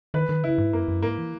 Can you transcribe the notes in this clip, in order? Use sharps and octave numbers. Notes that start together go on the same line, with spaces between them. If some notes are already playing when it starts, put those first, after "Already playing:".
D#3 B4
D#3
C#3 E4
G#2
F#2 A#3
F#2
G#2 A#3
E3